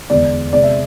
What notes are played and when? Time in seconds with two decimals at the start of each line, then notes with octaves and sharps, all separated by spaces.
0.10 E2 D3 G#3 B3 D5
0.53 C3 G#3 B3 D5
0.63 E5